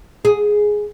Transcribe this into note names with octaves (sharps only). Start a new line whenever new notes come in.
G#4